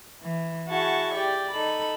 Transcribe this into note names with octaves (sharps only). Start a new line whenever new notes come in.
E3
E4 F#4 G#4 F#5 A5 C#6
G4 D5 G5
D#4 A4 B5